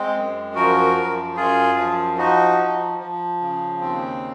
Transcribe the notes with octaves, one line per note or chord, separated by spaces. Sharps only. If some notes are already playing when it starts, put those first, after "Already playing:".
Already playing: G#3 C4
F#2
F3 F#4 A#4
F#2
F#2 F4 G#4
F3
F3 D#4 F#4
F3
F3
C#3
D#2 C4